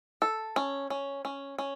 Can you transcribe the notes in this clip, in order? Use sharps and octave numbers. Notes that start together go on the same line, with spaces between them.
A4
C#4
C#4
C#4
C#4